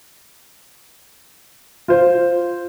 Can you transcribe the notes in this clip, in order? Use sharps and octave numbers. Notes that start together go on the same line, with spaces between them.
F4 C5